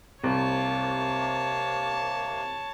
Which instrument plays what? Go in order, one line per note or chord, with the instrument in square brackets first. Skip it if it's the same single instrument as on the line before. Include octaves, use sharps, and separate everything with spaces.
[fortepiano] C2 [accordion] C3 A#3 [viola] C#5 A5